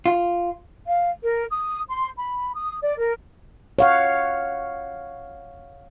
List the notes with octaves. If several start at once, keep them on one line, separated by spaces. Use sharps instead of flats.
F4
F5
A#4
D#6
C6
B5
D#6
D5
A#4
C#5 F5 F#5